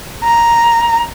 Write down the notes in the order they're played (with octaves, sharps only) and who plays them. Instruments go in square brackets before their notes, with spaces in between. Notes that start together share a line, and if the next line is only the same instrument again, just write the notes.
[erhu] A#5